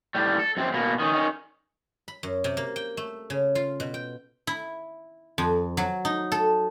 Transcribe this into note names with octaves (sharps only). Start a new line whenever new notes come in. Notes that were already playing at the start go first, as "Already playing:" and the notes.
A2 G3
A4
F#2 C4
B2 A#3
D#3 C#4
D#3 C#4
B5
F#2
C3
A#3
G5
A3
C#3
F4
B2
G5
E4
F2
F#3
D#4
A4